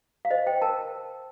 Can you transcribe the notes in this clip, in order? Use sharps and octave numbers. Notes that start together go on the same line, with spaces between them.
F5
C5 D#5
C5 G5
A#4 A5